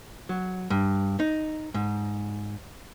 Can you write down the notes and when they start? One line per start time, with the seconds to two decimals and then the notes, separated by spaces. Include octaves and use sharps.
0.29 F#3
0.70 G2
1.20 D#4
1.74 G#2